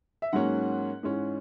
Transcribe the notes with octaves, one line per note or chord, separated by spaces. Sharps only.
E5
G#2 F#3 A#3 C#4 F#5
G#2 E3 G#3 C#4